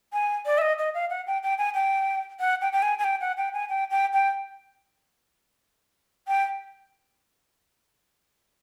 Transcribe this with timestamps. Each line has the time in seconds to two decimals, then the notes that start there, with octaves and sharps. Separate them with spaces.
0.13 G#5
0.46 D5
0.58 E5
0.62 D#5
0.78 D#5
0.94 F5
1.10 F#5
1.27 G5
1.43 G5
1.58 G#5
1.74 G5
2.40 F#5
2.61 G5
2.73 G5
2.82 G#5
2.99 G#5
3.04 G5
3.21 F#5
3.37 G5
3.54 G#5
3.69 G5
3.91 G5
4.13 G5
6.28 G5